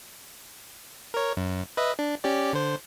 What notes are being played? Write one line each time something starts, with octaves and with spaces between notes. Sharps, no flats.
A#4 C#5
F#2
B4 D#5 E5
D4
C#4 G4 D5
D3 C5